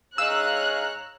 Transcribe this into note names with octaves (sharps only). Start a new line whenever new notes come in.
G#2 D#4 C#5 F5 A#5 E6 F#6